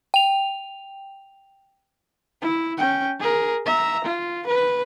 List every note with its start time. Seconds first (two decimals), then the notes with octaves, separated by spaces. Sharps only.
0.14 G5 F7
2.42 E4
2.78 C#4 G5
3.20 G#4 A#4
3.66 E5 A#5
4.04 F4
4.47 B4